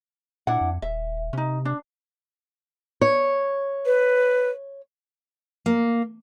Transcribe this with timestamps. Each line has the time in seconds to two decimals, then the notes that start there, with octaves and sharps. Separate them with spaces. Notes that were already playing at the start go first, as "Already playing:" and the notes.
0.47 A#2 D4 E4 F#5
0.61 F2
0.82 D#1 E5
1.33 C3 C#4 D#4
1.65 D4
3.01 C#5
3.86 B4
5.66 A#3